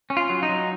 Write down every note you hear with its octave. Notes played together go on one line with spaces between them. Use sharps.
C#4
F4
F#3
D#4
F#3